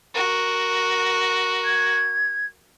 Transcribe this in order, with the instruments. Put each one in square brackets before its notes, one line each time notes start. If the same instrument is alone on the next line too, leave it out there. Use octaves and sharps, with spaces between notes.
[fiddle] F#4 A#4
[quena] G#6